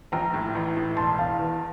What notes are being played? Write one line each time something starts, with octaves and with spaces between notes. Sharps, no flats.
A#1 G5 A#5
A2
A1
A2
E1 A5 C6
E2 F5 A5
E2